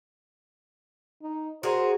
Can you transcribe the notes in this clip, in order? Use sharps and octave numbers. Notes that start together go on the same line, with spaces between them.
D#4
F#4 G#4 A#4 C5